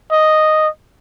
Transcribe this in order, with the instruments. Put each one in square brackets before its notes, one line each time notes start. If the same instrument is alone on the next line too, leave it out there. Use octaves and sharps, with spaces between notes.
[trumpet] D#5